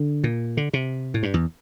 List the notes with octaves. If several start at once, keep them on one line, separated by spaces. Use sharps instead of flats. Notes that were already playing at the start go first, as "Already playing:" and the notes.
Already playing: D3
A#2
D3
C3
A2
G2
E2